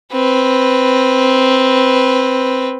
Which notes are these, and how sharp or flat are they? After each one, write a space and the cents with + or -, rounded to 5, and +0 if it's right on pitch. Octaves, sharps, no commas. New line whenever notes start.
C4 +5 B4 +0